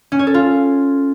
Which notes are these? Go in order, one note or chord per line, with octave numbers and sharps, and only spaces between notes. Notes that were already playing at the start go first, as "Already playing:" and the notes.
C#4
C#5
A4
F4